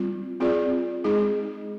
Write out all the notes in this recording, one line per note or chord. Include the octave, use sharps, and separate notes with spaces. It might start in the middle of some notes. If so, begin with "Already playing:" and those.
Already playing: G3 C4 F4
C4 F4 G#4 D5
G#3 D#4 G#4